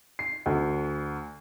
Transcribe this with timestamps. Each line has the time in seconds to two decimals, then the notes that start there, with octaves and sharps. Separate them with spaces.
0.19 C7
0.46 D2